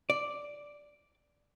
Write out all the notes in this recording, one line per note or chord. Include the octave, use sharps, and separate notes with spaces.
D5